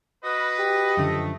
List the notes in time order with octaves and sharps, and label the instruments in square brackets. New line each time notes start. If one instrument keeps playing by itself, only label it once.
[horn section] F#4 B4 [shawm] D#5
[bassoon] G4
[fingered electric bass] F#2 D3 F3 [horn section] A3